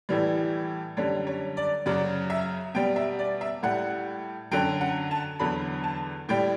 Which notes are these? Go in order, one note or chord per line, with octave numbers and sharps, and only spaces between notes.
A2 E3 G3
F#2 D3 G3 C#5
C#5
D5
F#2 C#3 F#3 D5
E5
B2 G3 G5
E5
D5
E5
A2 G3 F#5
F#2 D3 F#3 G5
F#5
A5
E2 D3 F#3 B5
A5
A2 G3 G5